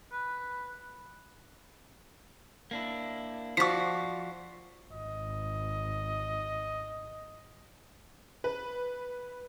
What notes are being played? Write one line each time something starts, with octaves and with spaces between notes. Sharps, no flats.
B4
A#3 D4 E4
F3 F#4 C5 D5 C#6 B6
G#1 D#5
B4